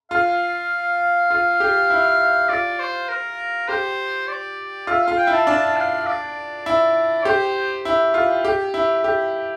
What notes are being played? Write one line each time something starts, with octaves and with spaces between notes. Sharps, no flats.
F4 F5
F4
G4
E4
F4 D5
C5
A#4
G4 C5
D5
F4 E5
F5
F4
G5
E4
A5
D4 A5
F5
D5
E4
G4 C5
E4
F4
G4
E4
G4